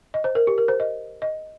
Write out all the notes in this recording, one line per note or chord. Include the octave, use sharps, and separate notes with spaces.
D#5
C5
A#4
G4
A#4
C5
D#5
D#5